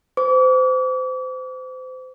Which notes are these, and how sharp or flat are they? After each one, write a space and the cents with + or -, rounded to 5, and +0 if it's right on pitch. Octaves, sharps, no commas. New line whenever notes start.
C5 -30 D6 -40